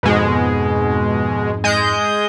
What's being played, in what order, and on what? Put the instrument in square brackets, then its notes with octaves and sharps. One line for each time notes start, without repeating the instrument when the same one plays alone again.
[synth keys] F2 G#2 [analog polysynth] B2 G#3
[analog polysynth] G#3 D#5 G6